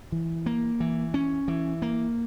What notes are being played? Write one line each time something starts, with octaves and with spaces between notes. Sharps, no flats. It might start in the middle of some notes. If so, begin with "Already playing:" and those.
E3
A#3
E3
C#4
E3
A#3